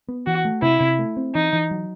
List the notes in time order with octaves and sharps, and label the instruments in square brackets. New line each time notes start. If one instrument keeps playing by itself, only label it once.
[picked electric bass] B3
[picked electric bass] E3 [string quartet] F#4
[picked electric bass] A3
[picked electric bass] C3 [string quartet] E4
[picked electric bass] C3
A3
C4
[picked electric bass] E3 [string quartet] D#4
[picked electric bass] E3
F#3